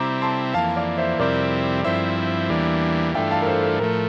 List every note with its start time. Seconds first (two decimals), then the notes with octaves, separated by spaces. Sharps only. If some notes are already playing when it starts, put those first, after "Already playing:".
Already playing: C3 G3 C4 E4 A#5 D6
0.22 A5 C6
0.54 F2 E3 A#3 F5 A5
0.76 D5 F5
0.98 C5 E5
1.19 F2 C3 G3 C4 E4 A#4 D5
1.84 G2 F3 C4 E4 C5 E5
2.49 E2 E3 G3 A#3 D4
3.14 G2 E3 A3 D4 F4 E5 G5
3.31 F5 A5
3.42 A#4
3.46 A4 C5
3.63 A#4
3.80 A2 F3 A3 A#4